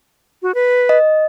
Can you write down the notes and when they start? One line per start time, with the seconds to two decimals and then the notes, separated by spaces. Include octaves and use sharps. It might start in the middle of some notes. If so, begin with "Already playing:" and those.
0.42 F#4
0.55 B4
0.89 D#5